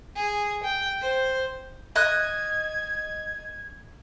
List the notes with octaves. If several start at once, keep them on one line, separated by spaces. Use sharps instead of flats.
G#4
G5
C5
D#5 F#6 G#6